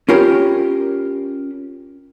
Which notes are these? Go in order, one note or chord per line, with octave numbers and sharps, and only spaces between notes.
C#4 F4 G4 A#4 B5